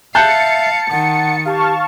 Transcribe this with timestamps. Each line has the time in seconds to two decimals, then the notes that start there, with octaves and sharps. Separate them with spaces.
0.15 E5 F5 A5 F#6 G6 A6 C#7
0.91 D#3 F#5
1.46 G4 F5 A5 C#6